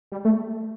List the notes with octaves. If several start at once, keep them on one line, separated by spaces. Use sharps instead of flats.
G3
A3